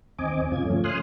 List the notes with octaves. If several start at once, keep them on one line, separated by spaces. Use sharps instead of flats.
D#2 C4 D#5 G#5 D6
G2 C#3 F4 G#6
F3 A3 C#4
G#5 C6 D#6 F6 F#6